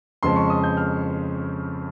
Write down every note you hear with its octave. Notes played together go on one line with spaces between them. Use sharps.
F2 C#3 F3 G#3 C6
C#6
D#6
G6
F6